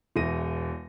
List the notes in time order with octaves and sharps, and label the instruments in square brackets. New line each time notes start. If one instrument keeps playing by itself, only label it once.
[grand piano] E1 E2 E4 A#6 D#7